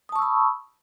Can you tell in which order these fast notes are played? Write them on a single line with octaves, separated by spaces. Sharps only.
D#6 A5 C#6 E6 B5